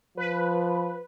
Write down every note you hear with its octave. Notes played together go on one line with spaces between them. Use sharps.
F3 B4